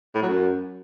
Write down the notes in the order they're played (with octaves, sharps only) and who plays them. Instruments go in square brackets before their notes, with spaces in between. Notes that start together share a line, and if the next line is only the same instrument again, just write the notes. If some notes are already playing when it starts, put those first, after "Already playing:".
[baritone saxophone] A2
F#3
F#2